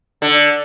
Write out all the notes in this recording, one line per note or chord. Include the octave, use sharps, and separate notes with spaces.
D3